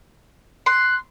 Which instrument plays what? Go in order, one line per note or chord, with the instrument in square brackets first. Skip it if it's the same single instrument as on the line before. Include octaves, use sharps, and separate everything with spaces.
[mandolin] C6 [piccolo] F#6